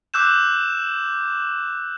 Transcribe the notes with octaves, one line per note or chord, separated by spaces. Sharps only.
D6 E6 F#6 G6 E7